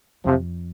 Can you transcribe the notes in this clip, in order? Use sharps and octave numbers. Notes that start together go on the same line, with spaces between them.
F2 C3 F3